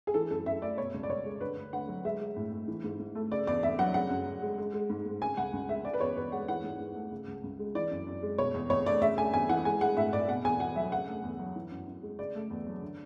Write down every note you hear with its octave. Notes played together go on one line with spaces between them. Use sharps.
G#4
E3 A4
F#2 A4
F#2 E5
A3 D5
B2 C#5
C#2
D5
C#2 C#5
G#3
D3 B4
D2
D2 F#5
F#3
G#3 E5
G#3
A2
A2
E3
G#2
G#2
A3
C#3 D5
E2 D5
E2 E5
F#3 F#5
C#3 F#5
F#2
F#2
G#3
G#3
G#3
G#2
G#2
C#3 G#5
C#2 F#5
C#2
G#3 E5
C#3 D5
B4
E2 C#5
E2 B4
G#3 F#5
E3 F#5
G#2
G#2
A3
C#3
C#2
C#2
G#3
E3 D5
F#2
F#2
G#3
B2 C#5
E2
E2 C#5
A3 D5
C#3 E5
A3 G#5
E2 G#5
E3 F#5
G#3 G#5
G#3 F#5
A2 E5
A2 D5
B2 F#5
E2 G#5
E2 F#5
F#3 E5
C#3 F#5
A3
E2
F#3
E3
F#2
F#2
G#3
C#3 D5
A3
E2
F#3
D3